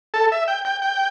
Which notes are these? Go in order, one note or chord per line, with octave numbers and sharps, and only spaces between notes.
A4
E5
G5
G5
G5